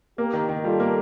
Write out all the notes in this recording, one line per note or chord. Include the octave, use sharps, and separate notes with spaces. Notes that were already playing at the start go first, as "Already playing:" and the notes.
A#3 G4 A#4
D#3
D#3
G3 F4 A4
A#3